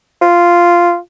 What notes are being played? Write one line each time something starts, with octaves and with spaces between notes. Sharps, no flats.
F4